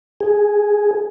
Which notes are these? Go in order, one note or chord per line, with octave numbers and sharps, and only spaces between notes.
G#4